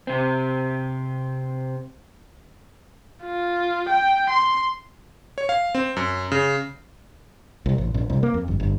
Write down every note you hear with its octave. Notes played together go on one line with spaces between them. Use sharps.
C3 C4
F4
G5
C6
C#5
F5
C4
F#2
C#3
C2
A1
A#1
C2
A#3
F2
G1
G1